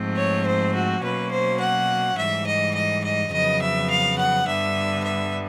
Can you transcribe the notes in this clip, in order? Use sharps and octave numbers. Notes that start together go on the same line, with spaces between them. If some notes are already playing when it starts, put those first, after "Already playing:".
Already playing: G#2 F3 A3 C4
C#5
C5
F#4
B2 F#3 A#3 C#4 B4
C5
F#5
G#2 E3 G3 E5
D#5
D#5
D#5
F2 C#3 F#3 B3 D#5
E5
F5
F#5
G2 D3 G3 B3 E5
E5